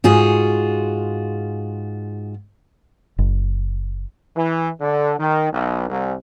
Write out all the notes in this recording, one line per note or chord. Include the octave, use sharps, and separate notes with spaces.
G#2 F4 F#4 G#4
F#1
E3
D3
D#3
B1
C2